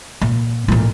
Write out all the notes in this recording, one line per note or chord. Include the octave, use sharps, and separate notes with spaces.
A#2
A1 A#2